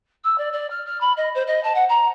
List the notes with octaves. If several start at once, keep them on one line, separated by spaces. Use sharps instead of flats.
E6
D5
D5
F6
F6
B5
D#5
C5
D#5
A5
F#5
A#5